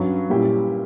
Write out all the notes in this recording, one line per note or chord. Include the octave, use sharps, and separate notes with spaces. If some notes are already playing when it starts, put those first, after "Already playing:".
Already playing: G2 F#3 C#4
A#2 G3 C#4 E4 G4